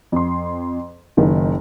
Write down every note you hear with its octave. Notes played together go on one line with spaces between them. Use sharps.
F2 C6
F#1 D#3